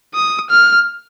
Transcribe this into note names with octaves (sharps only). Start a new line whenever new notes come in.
D#6
F6